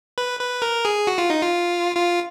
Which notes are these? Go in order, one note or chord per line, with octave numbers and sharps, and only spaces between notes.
B4
B4
A#4
G#4
F#4
F4
D#4
F4
F4